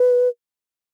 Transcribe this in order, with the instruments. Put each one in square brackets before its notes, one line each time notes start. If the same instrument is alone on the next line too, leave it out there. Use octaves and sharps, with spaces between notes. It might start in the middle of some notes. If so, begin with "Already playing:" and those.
Already playing: [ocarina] B4